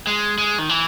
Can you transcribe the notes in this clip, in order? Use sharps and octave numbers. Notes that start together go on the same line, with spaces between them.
G#3
G#3
D#3
E3